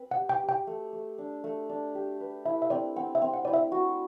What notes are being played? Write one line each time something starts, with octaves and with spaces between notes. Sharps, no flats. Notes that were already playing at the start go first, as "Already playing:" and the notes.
Already playing: C4 B4
F#5
G4
G5
G4
G5
A3
A3
D4
A3
D4
G4
B4
E4 E5
E5
C4 D5
C4 F#5
E5
C4
F#5
E4 D5
E5
F#4